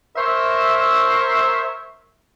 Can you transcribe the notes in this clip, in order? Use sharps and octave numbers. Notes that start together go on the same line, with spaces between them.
A#4 C5 C#5 E5